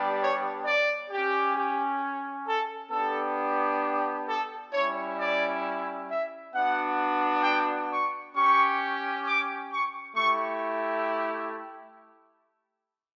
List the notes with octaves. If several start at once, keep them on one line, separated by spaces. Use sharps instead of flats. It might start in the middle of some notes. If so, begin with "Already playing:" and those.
Already playing: G3 B3 D4 G4
C#5
D5
C#4 G4
G4
A4
B3 D4 G4 A4
A4
G3 C#4 E4 C#5
D5
E5
B3 D4 F#4 F#5
G5
C#6
C#4 G4 C#6
D6
C#6
A3 E4 G4 C#6